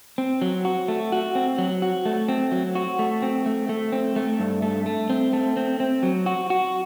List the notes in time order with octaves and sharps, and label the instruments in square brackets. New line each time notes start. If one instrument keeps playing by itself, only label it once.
[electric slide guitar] C4
F#3
F#4
A3
F#4
C4
F#3
F#4
A3
C4
F#3
F#4
A3
C4
A3
A3
C4
A3
G2
A3
A3
C4
A3
C4
C4
F#3
F#4
F#4